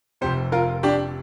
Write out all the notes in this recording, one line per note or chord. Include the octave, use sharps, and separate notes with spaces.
F1 F2 C3 G4 C5
F4 A#4
D4 G4